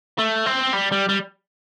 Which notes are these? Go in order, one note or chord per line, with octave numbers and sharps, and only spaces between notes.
A3
C4
G3
G3
G3